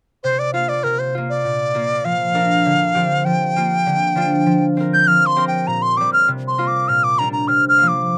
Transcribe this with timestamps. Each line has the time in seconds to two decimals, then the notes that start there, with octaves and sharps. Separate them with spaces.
0.23 C3 C5
0.39 D5
0.54 A#3 F4 F5
0.69 D5
0.83 C3 A#4
0.99 C5
1.15 A#3 F4
1.29 D5
1.45 A#2
1.74 A#3 F4 A#4
2.05 F3 F5
2.34 D4 A#4
2.66 D3
2.95 F3 C4 G4
3.25 F3 G5
3.56 A#3 F4
3.86 D3
4.15 F3 D4 F4
4.46 F3
4.77 C4 A#4
4.93 G6
5.07 F3 F6
5.26 C6
5.36 C4 G4 A#4
5.48 G5
5.67 A#2 A#5
5.82 C6
5.97 G3 C4 D6
6.13 F6
6.28 C3
6.48 C6
6.58 A#3 F4 A#4
6.67 D6
6.88 A#2 F6
7.04 D6
7.18 G3 D4 G4 A#5
7.33 A#5
7.48 C3 F6
7.69 F6
7.78 F3 A#3
7.88 D6